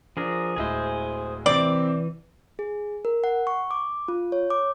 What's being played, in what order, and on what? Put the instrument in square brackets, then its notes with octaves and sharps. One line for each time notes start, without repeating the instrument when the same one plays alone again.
[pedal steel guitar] F3 G#4 A#4 [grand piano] D4
[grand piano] D1 G#3 E4 [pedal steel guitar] G#4 C5
[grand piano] C3 C4 [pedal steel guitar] E3 [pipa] D5
[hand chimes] G#4
A#4
F#5
C#6
D6
F4
C#5
D6